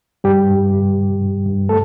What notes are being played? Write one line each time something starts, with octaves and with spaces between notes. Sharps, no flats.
G2 G3 G4
G2
G2
G2
G2
G2
A3 A4